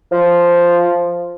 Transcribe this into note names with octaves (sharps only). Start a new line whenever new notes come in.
F3